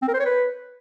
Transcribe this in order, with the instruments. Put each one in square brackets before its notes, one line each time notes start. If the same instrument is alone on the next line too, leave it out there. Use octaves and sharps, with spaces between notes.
[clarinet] C4
A#4
C5
C#5
B4